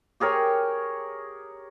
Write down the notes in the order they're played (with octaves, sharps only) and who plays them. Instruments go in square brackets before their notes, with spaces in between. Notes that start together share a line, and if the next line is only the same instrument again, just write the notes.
[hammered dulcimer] G4 G#4 A#4 C#5